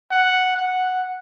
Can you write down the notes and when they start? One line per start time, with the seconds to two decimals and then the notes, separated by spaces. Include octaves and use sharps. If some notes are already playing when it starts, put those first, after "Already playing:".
0.11 F#5
0.57 F#5